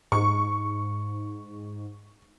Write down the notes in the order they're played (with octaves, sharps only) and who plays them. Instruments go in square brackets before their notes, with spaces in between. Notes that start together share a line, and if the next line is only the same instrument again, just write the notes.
[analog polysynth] G#2 [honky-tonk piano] C#6